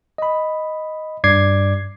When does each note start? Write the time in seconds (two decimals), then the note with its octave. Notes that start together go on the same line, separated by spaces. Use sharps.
0.18 D#5 B5
1.24 G2 D5 D6 G#6 C7